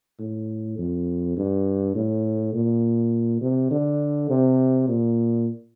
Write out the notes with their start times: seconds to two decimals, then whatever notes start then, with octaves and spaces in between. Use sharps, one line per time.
0.20 A2
0.78 F2
1.37 G2
1.95 A2
2.54 A#2
3.41 C3
3.71 D3
4.30 C3
4.88 A#2